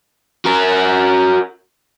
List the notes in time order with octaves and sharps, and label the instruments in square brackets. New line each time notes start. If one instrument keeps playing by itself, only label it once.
[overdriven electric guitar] F#4 A#4